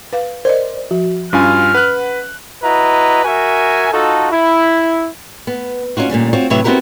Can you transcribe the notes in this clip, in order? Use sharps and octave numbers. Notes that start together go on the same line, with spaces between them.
B4 F5
A#4 C5 D5 D#5
F3 F#4
G2 C#4 F4 G#5 F6
B4 F#5 F#6
E4 F#4 B4 D#5 A#5
F#4 A#4 E5 G#5
D#4 F4 F#4 A4
E4
B3
C#4 D#4 F4 F#4
A#2 D3 G3 C#4
C4 F4 F#4 C#5
A2 C3 F#3 B4 C#5 E5
B3 C4 E4 F#4 G4 A#4